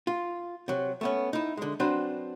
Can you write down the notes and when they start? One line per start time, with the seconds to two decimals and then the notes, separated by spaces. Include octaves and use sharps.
0.07 F4
0.68 C3 F#3
1.01 A3 B3 C#4
1.33 D#4 E4
1.57 D3 G#3
1.80 F#3 C4 D4 B4 C5